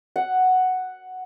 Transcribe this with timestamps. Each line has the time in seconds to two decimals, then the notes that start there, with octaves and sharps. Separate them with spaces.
0.16 F#5